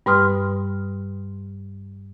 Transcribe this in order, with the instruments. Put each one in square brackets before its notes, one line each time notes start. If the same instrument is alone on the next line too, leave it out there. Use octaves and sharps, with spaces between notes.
[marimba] G2 G3 B4 C6 D#6 F6